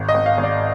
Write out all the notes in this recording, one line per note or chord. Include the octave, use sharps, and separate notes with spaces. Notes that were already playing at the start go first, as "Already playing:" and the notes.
Already playing: G#1
D#5
G#1
F5
G#1
D5